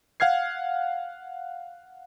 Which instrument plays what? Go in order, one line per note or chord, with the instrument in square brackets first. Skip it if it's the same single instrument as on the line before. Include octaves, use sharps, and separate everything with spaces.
[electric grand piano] F5 F#5 F6 G#6 C7